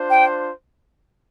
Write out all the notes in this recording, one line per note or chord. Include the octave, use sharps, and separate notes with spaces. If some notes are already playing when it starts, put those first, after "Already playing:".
Already playing: D4 F4 C5
G5